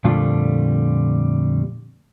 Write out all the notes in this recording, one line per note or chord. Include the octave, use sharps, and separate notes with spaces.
F2 A#2 D3 G3 A3 F4